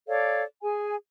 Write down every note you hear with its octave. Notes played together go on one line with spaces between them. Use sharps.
A4 C#5 D5 F5
G#4 G#5